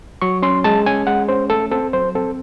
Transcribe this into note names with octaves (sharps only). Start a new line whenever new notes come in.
F#3 C#6
C#4 C6
G#3 A5
C#4 G#5
G#3 F#5
C#4 C5
A3 A4
C4 A4
F#3 C5
C4 A4